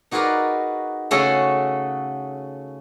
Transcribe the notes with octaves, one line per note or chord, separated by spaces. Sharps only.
D#4 F#4 G#4 A#4 B4 D5
C#3 A3 C#4 F#4 G#4 A4